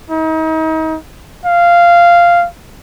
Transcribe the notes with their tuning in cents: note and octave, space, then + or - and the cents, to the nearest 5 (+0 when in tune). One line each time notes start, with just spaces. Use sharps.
D#4 +35
F5 -10